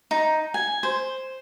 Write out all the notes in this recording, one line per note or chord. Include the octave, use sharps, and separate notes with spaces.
D#4
G#5
C5